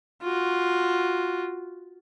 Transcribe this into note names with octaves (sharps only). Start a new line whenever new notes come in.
F4 F#4